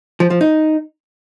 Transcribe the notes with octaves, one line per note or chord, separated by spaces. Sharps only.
F3
F3
D#4